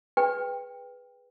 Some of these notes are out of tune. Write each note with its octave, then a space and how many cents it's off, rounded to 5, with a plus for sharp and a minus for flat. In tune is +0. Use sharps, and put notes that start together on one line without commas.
G#4 +0 B4 +0 G5 +15